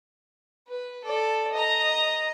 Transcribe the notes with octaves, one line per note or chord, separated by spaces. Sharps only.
B4
A4 D5
D#5 A#5